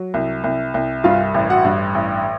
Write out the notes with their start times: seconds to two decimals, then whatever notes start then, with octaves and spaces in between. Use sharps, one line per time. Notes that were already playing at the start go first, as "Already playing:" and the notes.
Already playing: F#3
0.14 C2
0.44 C2
0.74 C2
1.04 G2 F4 F5
1.34 A1
1.49 F#4 F#5
1.65 G2
1.94 A1